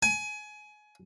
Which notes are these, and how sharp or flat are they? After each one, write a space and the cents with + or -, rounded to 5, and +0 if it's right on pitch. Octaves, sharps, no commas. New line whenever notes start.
G#5 +25